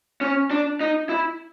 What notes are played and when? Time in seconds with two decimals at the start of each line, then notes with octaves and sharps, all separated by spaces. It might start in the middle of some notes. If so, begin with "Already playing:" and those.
0.21 C#4
0.51 D4
0.81 D#4
1.09 E4